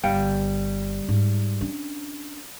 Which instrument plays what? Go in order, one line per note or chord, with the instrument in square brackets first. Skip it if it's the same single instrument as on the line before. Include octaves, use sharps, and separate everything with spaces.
[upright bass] G1 [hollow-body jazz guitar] G3 F5 G5
[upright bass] G#2
C#4 D4